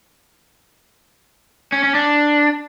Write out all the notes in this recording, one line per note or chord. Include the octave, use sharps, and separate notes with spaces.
C#4
C#4
D4